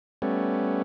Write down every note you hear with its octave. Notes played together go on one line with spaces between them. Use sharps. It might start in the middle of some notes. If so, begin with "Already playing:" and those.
G3 A3 B3 C#4